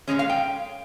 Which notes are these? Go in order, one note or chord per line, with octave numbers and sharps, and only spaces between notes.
A#2 F3 G#3 C#4 C#5
F5
G5